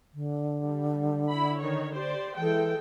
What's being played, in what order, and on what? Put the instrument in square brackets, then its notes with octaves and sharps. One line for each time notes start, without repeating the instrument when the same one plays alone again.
[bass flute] D3
[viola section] G3
E4 B5
D#3 C#5
G4 C5 D5
[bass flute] E3 [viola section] G#3 A4 G5